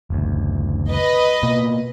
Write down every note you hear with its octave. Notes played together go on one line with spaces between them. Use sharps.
F#1 D2
B4 D#5
B2 A#3